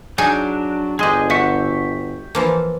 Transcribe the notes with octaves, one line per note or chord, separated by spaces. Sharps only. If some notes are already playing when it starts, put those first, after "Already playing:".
F#3 D4 D#4 G#4 G#5
G1 G#3 G4 G#4 D#5
F#4 G4 E5 C#6
E3 F3 A#3